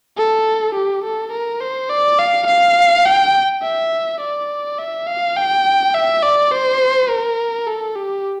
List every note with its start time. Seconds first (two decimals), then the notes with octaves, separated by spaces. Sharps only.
0.17 A4
0.75 G4
1.04 A4
1.32 A#4
1.61 C5
1.89 D5
2.19 F5
2.47 F5
3.05 G5
3.63 E5
4.21 D5
4.78 E5
5.07 F5
5.36 G5
5.94 E5
6.22 D5
6.52 C5
7.09 A#4
7.67 A4
7.95 G4